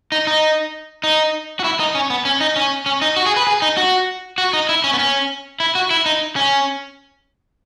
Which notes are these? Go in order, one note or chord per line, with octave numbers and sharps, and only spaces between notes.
D#4
D#4
D#4
F#4
E4
D#4
C#4
B3
C#4
D#4
C#4
C#4
D#4
F#4
G#4
B4
G#4
D#4
F#4
F#4
D#4
E4
C#4
B3
C#4
E4
F#4
E4
D#4
C#4